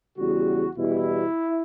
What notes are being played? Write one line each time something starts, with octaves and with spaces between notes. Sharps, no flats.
E2 C#3 G3 F#4
E2 B2 G3 E4